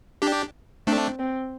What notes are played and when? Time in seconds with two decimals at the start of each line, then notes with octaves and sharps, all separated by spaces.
0.22 D4 G4
0.87 A3 C4 D4
1.19 C4